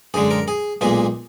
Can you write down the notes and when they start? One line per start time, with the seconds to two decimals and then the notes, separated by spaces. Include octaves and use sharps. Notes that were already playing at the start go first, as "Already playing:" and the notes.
0.14 F#2 D3 G#3 G#4
0.31 A#4
0.48 G#4
0.81 B1 A#2 G#3 G#4